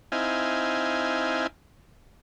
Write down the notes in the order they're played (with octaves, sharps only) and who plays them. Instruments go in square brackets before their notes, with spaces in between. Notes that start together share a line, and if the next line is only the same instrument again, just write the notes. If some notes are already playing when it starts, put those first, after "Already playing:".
[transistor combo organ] C4 D#4 E4 F5 G#5